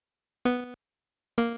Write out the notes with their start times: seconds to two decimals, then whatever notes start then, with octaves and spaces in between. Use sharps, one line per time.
0.45 B3
1.38 A#3